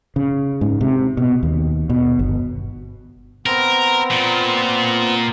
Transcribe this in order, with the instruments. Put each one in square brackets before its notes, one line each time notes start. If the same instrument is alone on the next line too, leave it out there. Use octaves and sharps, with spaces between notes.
[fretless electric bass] C#3
G#2
C3
B2
D#2
B2
G1
[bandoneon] B3 C4 [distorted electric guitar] A#4
[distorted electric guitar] A#2